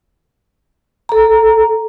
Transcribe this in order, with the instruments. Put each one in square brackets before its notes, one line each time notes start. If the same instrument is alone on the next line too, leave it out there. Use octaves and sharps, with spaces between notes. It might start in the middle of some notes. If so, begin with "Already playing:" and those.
[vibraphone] A4 A#5